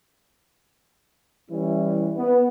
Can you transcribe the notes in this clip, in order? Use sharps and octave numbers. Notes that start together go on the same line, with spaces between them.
E3 G3 C#4 E4
B3